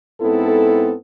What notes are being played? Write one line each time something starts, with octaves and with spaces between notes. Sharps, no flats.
G#2 B3 C4 E4 A4